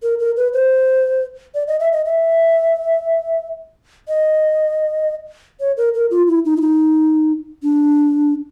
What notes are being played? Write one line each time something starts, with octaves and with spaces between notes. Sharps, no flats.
A#4
A#4
B4
C5
D5
D#5
E5
D#5
E5
D#5
C#5
A#4
A#4
F4
E4
D#4
E4
D#4
D4